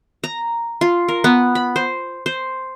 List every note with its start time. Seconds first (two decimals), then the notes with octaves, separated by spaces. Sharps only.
0.24 A#5
0.81 F4
1.08 A#4
1.24 B3
1.55 B5
1.76 C5
2.26 C5